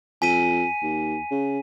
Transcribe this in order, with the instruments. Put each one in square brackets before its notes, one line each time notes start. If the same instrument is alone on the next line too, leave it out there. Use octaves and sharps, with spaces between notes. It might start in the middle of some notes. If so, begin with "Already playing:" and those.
[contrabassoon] F2 [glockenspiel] G#5 B6 D#7
[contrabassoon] D#2
C#3